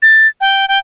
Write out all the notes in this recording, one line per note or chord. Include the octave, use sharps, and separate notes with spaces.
A6
G5
G5